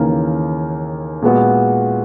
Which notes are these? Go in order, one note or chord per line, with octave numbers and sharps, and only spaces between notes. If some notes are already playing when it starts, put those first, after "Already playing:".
Already playing: D#2 C#3 E3 A#3
A#2 G#3 B3 F#4